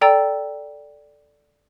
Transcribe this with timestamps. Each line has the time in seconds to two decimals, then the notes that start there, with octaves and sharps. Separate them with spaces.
0.01 A4 D5 G5 A#5 E6 A6